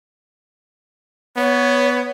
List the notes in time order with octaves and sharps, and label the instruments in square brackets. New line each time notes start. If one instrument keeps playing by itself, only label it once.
[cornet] B3 [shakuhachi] C#5